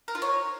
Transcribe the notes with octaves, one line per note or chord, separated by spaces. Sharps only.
A#4
F4
C#5